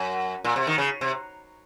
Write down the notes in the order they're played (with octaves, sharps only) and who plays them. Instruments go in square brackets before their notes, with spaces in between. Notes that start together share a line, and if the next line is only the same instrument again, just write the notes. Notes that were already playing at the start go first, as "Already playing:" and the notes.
Already playing: [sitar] F#2
A#2
C3
D#3
C#3
C3